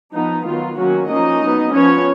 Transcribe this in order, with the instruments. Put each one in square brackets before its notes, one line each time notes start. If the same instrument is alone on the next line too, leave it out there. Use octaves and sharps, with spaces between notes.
[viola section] F3 B3 D#4
D#3 F#3 B3 F4
D#3 F#3 A#3 C#4 F#4
F3 A#3 C#4 D#4 D#5
F#3 B3
F3 B3 C#4 C#5